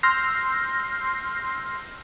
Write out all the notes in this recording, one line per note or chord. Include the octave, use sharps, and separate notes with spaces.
C6 E6 F6 G6 A#6 C7